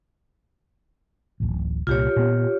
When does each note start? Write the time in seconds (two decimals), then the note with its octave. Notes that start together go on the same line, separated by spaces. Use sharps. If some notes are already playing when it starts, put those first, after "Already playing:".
1.40 D1 A1
1.87 C2 A#2 F4 G4 C#5
2.16 A#2 B3